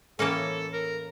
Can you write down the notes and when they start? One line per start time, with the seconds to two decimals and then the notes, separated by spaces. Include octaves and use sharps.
0.19 A2 E3 A#3 C#4 A4
0.73 A#4